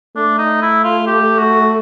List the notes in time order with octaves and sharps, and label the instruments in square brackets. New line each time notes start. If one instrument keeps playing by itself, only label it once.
[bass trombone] A3 [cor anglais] D4
[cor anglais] D#4
E4
F4
G4
F#4